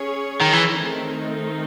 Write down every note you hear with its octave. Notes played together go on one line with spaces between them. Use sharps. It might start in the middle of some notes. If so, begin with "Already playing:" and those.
Already playing: C#4 G#4 C#5
D#3
E3
D#3 A3 C4 D#4